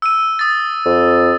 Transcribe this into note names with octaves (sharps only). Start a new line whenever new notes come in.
E6 D#7
D#6 A6
F2